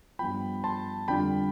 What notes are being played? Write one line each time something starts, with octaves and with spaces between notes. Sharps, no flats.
G2 F3 B3 F4 G5 B5
A5 C6
F2 D3 G3 D4 F4 G5 B5